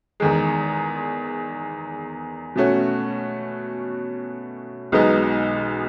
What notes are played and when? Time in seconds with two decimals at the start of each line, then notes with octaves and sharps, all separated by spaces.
0.20 E2 D#3 G#3
2.56 B2 A3 C#4 F#4
4.92 B1 B2 G#3 B3 D#4